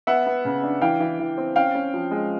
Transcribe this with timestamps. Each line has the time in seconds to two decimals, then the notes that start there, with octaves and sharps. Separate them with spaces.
0.07 B3 E5 F#5
0.26 B3
0.45 C#3
0.63 D4
0.81 E3 F5 G5
1.00 E3
1.19 E3
1.38 C4
1.56 C#4 F5 G5
1.75 C#4
1.94 F3
2.11 G#3